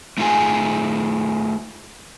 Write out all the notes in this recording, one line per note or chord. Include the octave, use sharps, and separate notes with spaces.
A3 D#4 F4 G#4 G#5